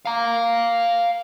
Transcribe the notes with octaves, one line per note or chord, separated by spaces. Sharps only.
F5 A#5